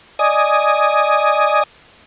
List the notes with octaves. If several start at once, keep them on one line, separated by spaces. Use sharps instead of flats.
D5 D#5 G#5 D#6